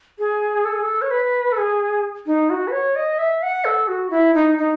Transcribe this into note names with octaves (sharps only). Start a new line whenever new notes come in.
G#4
A4
G#4
A4
C#5
B4
A4
G#4
D#4
F#4
B4
C#5
D#5
E5
F#5
A4
F#4
E4
D#4
D#4